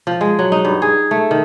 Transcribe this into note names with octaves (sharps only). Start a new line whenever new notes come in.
F3
G#3
F#3
D#4
G2
G#4
A3
D#3